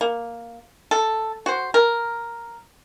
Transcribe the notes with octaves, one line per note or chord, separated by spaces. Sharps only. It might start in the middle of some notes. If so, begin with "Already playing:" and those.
A#3
A4
F#4 C5
A#4